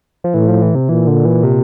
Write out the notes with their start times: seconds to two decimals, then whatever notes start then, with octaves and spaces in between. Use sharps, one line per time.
0.24 F3
0.34 A2 E3
0.48 F3
0.62 E3
0.75 C3
0.89 A#2 E3
1.07 D3
1.25 E3
1.43 C3